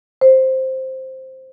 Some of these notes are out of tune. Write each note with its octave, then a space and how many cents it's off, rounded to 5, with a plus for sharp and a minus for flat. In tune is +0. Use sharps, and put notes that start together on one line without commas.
C5 +5